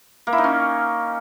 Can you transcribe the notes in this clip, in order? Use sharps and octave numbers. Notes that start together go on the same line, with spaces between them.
A#3
E4
D#4
C#4